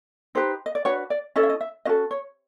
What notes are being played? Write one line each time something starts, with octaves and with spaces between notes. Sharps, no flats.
D#4 G4 B4 C5
D#5
D5
D4 F#4 B4 C#5
D5
C#4 E4 A4 D#5
E5
D#5
E5
C#4 F#4 A4 D#5
C#5